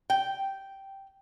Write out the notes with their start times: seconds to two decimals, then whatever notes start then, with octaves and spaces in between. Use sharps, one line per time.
0.10 G5